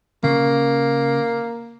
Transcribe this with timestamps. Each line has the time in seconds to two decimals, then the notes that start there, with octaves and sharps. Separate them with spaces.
0.24 C#3 A#3